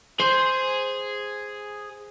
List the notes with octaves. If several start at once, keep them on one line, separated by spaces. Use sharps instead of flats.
G#4 C5